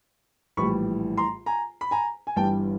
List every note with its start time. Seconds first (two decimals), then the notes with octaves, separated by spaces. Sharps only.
0.57 A#1 A2 E3 G3 B5 C#6
1.17 A#5 C6
1.46 G#5 A#5
1.81 B5
1.91 G#5 A#5
2.27 G#5
2.36 G1 G2 E3 G3 G5 A5